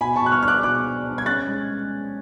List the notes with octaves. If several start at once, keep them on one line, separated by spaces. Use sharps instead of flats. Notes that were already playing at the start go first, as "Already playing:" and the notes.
B2 G#5 B5
A5 C#6
B2 F#6
C#6 F6
D4 F6
D6 F#6
B2 D6 F#6
D4
D4
G#6
C#4 F#6 A6
G#3